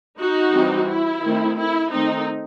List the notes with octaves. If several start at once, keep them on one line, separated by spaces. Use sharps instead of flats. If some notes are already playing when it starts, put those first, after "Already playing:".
D#4 F#4
E3 G3 C4
E4
D#3 A3 C4
E4
D#3 A3 C4 D#4